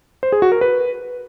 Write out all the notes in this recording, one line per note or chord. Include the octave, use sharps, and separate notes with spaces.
C5
G#4
F#4
A#4
B4